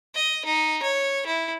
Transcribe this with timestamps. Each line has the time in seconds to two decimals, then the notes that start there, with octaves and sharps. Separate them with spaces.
0.14 D#5
0.45 D#4
0.82 C#5
1.26 E4